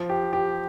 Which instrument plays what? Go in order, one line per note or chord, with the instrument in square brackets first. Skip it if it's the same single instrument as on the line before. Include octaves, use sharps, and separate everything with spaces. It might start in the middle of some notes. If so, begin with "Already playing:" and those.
Already playing: [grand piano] F3
G4
G4